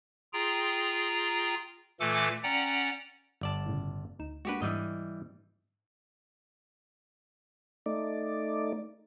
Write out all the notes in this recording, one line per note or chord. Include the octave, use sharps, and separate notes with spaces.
F4 G#4 G5 A#5
A#2 E3 A3 A4 G#5 D6
C#4 D5 F#5 G5 A#5
G1 D5 A5
A2 C#3
D2 D#4 E7
G#3 A#3 D4 F#4 G4 B4
G#2 E3 G3 D#5
A3 D#4 D5